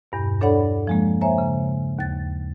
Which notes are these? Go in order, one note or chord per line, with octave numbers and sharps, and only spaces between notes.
E2 G2 B2
D4 A4 C#5 D5 F#5 B5
F3 G#3 A#3
C5 C#5 E5 G#5 A#5
C#3
D#2 A6